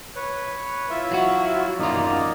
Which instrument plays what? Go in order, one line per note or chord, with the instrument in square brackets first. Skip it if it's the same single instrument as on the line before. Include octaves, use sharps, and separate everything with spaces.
[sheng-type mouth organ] B4 C#5
E4 F4 E5
[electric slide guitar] F#3 F#4
[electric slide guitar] F#2 D#3 F4 [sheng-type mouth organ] A#3 D5 D#5